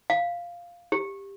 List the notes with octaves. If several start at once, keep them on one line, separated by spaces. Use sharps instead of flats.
F5
G4